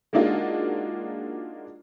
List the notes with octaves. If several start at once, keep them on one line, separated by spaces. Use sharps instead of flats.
G#3 A#3 D4 D#4 F4 F#4